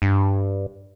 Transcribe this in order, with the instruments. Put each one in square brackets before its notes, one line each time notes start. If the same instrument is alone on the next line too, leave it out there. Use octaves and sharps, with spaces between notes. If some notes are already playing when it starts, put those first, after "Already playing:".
[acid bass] G2